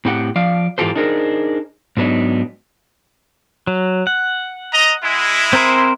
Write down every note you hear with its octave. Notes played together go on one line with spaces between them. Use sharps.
A2 C4 G4 B4 F#5
F3 D5 F5
G#2 E3 F4 G4 A4 C5
D4 D#4 G#4 A#4 C5
G#2 F#3 B3 D4 D#4
F#3
F#5
D#5 A#5
G#3 E4
C4 A#4 C5